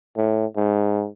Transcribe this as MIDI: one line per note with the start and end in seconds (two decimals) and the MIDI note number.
0.17 0.46 45
0.56 1.07 44